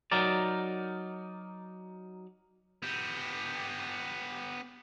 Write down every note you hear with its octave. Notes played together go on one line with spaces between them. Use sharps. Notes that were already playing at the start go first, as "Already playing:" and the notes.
F#3 D#4 A#4 D5
B3 G4